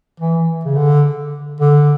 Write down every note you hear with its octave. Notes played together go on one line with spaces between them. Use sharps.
E3
C#3
D3
D3